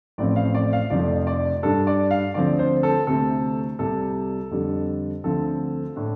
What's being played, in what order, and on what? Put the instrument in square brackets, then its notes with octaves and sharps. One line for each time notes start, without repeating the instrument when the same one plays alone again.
[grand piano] A1 A2 F3 C4 D5
F5
D5
F5
F1 F2 F3 A3 D5
D5
G2 G3 D4 A4
D5
F5
D2 D3 F3 C4 D5
C5
A4
D2 C3 A3 C4 A4
C2 C3 G3 A4
F2 D3 G3
D2 D3 F3 C4 A4
A2 A3 D4